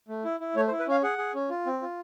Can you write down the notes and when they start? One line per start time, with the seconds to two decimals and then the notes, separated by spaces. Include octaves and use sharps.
0.08 A3
0.24 E4
0.40 E4
0.56 A3 C#5
0.68 C5
0.71 E4
0.79 B4
0.87 C#4 F5
1.03 G#4 F#5
1.18 G#4
1.34 C#4
1.50 F4
1.66 C4
1.82 F4